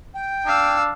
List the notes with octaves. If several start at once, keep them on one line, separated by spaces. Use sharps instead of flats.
G5
D4 F5 E6